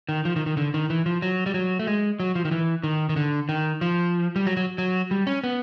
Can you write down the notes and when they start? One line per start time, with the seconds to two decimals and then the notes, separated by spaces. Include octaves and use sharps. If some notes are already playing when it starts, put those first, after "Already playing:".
0.09 D#3
0.25 F3
0.36 D#3
0.46 D#3
0.57 D3
0.74 D#3
0.90 E3
1.06 F3
1.22 F#3
1.46 G3
1.54 F#3
1.79 A3
1.87 G#3
2.20 F#3
2.35 F3
2.45 D#3
2.51 E3
2.83 D#3
3.09 D#3
3.16 D3
3.49 D#3
3.81 F3
4.36 G3
4.47 F#3
4.57 F#3
4.78 F#3
5.11 G3
5.27 C#4
5.44 B3